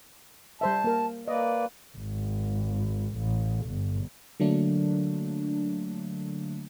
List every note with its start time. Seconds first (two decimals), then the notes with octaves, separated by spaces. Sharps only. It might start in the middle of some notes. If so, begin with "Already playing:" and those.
0.61 G3 C5 E5 A5
0.84 A#3 A#4
1.28 A#3 B4 D5 D#5
1.97 G#1
3.17 A1
3.67 G1
4.40 D3 F#3 A3 A#3 D4